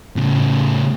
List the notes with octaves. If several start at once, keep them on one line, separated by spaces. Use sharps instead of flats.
A2 C#3